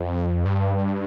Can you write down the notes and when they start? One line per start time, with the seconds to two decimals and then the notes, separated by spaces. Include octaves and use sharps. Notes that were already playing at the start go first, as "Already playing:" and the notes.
Already playing: F2
0.45 G2